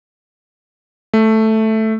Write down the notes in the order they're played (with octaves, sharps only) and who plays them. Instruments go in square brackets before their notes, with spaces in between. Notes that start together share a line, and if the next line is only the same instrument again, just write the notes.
[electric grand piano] A3